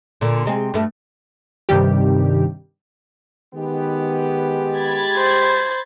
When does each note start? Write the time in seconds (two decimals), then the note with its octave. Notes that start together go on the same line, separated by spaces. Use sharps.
0.21 A#2 D3
0.45 C3 G#3 C4
0.74 G2 A3
1.69 G2 C3 D#3 G3 G4
3.55 D#3 G#3 B3 G4
4.77 B5 G#6 A6
5.17 C5